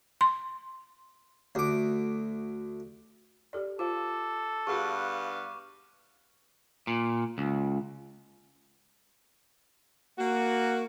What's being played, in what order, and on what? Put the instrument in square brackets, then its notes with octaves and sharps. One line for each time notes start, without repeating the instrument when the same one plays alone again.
[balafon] C6
[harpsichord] D2 D6
[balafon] G4 A4 D5
[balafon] F4 C5 F5 [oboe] A4 [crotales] D6
[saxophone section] G2 B3 F5 [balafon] F#4 G#4 [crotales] C#6
[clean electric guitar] A#2
C#2
[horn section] A#3 F#4